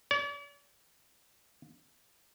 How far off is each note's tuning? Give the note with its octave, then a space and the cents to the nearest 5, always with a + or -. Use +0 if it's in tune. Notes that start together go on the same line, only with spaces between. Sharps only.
D5 -45